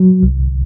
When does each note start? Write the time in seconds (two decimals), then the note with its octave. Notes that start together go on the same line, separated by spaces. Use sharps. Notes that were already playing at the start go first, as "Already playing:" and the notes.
Already playing: F#3
0.23 C2